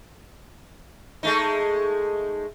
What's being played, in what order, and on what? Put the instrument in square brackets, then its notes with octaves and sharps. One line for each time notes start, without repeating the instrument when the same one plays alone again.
[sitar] G#3 A3 D#4